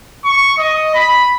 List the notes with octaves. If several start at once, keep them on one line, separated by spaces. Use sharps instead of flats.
C#6
D#5
B5